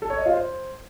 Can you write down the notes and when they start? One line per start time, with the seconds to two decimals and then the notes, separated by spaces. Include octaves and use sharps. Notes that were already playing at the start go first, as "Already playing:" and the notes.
0.02 A4
0.10 C#5
0.18 D#5
0.26 F4
0.34 C5